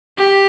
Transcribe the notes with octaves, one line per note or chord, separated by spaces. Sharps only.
G4